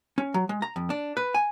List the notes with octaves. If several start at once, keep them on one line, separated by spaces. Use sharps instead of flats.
C#4
F#3
G#3
A#5
F2
D4
B4
G#5